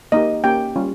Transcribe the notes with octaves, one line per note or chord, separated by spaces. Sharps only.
A#3 D#4 G4 D#5
A#3 C#4 G4 G5
G3 C#4 F4